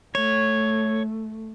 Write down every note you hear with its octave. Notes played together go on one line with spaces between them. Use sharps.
A3 C#5